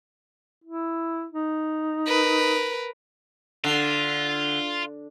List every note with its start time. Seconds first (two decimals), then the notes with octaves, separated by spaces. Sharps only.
0.64 E4
1.31 D#4
2.06 A#4 B4
3.64 D3 F4